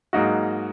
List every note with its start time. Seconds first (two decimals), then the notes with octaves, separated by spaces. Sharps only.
0.13 G#2 F#3 A#3 D#4 F#4